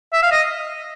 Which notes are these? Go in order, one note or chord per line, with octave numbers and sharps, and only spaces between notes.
E5
F5
D#5